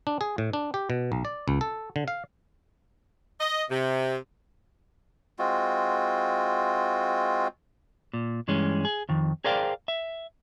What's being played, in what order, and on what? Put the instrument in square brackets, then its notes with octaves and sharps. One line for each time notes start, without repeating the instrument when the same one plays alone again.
[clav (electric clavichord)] D4
G#4
A2
D4
G4
B2
B1
D5
C#2
A4
D3
F5
[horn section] D#5
C3
[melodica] G#3 C4 F4 F#4
[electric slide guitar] A#2
G2 E3 G#3 C#4
G#4
F2 D#3
G#4 A#4 C5 D5 F5 G5
E5